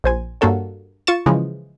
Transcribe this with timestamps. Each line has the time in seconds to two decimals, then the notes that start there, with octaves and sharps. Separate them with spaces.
0.04 A#1 C5 G#5
0.41 G2 A#3 F#4 A4 C#5
1.07 F4 C#6 A6 E7
1.26 C#3 E3 F3 G#3